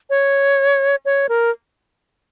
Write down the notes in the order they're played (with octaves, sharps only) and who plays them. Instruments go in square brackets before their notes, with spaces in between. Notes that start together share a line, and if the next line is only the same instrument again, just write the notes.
[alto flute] C#5
C#5
A#4